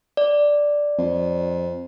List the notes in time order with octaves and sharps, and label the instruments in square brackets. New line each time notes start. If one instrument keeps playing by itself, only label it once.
[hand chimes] D5
[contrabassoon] F2